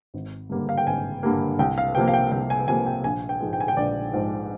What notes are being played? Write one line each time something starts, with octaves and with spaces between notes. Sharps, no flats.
G#1
G2 D3 G3 A#3
F5
G5
G#1 G#5
G2 D3 G3 A#3
C2 G5
F5
C3 F3 A#3 G5
F5
G5
C2 G5
G#5
C3 F3 A#3 G#5
G5
A#1 G#5
G5
G#2 F3 G#3
G5
G#5
G5
A#1 D5
G#2 F3 G#3